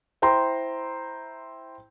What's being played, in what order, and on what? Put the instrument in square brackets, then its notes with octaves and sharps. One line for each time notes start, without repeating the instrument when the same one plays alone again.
[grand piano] E4 C5 G5 A#5 C6